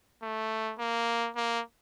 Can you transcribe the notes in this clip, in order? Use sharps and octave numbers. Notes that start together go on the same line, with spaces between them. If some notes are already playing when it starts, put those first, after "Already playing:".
A3
A#3
A#3